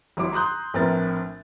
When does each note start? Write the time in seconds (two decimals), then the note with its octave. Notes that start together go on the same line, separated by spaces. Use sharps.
0.17 G#1 F#3 E4 D6
0.32 A#5 C6 D#6 F#6 G6
0.74 A#1 A2 C4 A#4 B4 A6